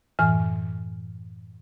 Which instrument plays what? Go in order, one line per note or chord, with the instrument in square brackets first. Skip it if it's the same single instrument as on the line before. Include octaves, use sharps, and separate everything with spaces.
[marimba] F#2 A2 E3 G#5 F6